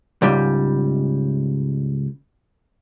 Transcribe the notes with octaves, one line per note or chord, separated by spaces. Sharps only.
C#2 G#2 G3